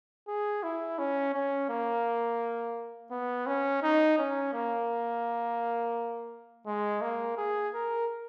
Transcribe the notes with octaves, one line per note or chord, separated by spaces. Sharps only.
G#4
E4
C#4
C#4
A#3
B3
C#4
D#4
C#4
A#3
G#3
A#3
G#4
A#4